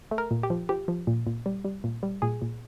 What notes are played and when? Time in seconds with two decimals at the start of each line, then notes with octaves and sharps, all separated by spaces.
0.11 A3
0.18 A#4
0.31 A#2
0.43 G4
0.50 F3
0.69 F3 G4
0.88 F3
1.07 A#2
1.27 A#2
1.46 G3
1.65 G3
1.84 A#2
2.03 G3
2.22 A#2 G#4
2.42 A#2